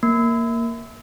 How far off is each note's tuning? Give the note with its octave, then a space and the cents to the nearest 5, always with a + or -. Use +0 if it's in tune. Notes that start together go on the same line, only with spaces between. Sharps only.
A#3 -5